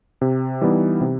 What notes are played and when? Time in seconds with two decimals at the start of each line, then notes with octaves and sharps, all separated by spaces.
0.21 C3
0.61 E3 G3 B3 D#4
1.01 C3